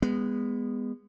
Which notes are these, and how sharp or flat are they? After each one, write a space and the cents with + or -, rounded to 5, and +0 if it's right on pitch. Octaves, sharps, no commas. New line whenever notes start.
G#3 -20 B3 +0